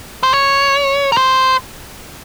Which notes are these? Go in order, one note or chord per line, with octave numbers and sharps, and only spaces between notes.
C5
C#5
A#4
C5